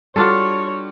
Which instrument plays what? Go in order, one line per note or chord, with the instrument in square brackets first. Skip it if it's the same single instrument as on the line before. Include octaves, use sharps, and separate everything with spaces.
[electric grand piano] G3 F#4 [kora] D4 F4 A4 [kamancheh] C#5